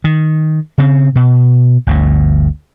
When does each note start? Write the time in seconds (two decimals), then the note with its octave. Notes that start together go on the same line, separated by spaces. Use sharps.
0.04 D#3
0.78 C#3 C4
1.16 B2
1.87 G1 D2 G2